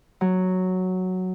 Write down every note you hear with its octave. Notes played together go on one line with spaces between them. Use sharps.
F#3